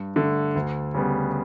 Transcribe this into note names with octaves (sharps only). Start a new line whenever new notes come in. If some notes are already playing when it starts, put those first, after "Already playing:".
Already playing: G2
D3 A3
D2
C#3 G3 B3